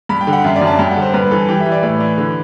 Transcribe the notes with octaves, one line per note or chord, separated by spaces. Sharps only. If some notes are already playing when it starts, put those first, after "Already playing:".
G2 B5
G5
D3
F#5
F#2 E5
D5
F#2
A5
G2 G5
F#5
D3 C5
G2 B4
E3 A4
E3 G4
E5
E3
D5
A2 D5
E3
D3